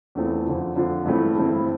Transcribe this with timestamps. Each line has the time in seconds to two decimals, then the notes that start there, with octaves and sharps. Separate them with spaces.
0.15 E2 E3 A3 C4 F4
0.46 F2 D3 F3
0.76 F2 D3 F3
1.06 G2 E3 A3 C4 E4
1.36 G2 E3 A3 C4 E4